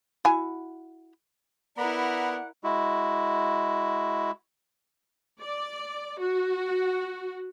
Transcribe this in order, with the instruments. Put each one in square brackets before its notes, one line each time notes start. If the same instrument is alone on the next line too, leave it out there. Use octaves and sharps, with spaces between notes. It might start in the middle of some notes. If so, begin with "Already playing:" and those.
[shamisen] E4 F#4 G#5
[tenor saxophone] B3 [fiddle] E4 A#4 [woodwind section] D5 F#5 [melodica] A#5 B5
[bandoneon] G#3 E4 F#4
[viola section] D5
F#4